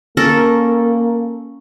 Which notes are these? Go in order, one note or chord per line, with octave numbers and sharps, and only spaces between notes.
A#3 C#4 A4 A#4